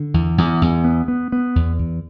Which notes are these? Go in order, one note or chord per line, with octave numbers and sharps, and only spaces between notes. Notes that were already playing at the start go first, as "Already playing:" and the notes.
Already playing: D3
E2
E2
E2
B3
B3
B3
E2
E2